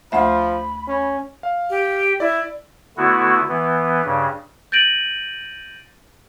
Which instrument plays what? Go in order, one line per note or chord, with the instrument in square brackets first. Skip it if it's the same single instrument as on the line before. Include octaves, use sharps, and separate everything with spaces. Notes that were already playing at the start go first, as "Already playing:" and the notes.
[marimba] D2 A3 E5 [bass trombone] F3 [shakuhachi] B5
[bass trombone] C#4
[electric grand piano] F5
[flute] G4
[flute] E4 [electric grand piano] D5
[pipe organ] D3 A3 B3 E4 F#4
E3 B3
G2 C#3
[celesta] G6 A6 A#6 D7 D#7 F#7